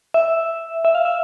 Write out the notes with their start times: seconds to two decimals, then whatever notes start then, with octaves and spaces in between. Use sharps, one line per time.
0.14 E5
0.85 E5
0.95 F5
1.05 E5